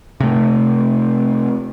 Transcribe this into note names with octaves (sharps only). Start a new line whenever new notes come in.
C3 A3